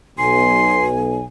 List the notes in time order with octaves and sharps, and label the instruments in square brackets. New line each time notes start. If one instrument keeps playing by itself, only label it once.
[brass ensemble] B1 [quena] G#5 [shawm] C6